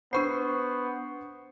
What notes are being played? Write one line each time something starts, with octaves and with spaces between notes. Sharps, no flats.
B3 D4 C5 B5 C#6 C7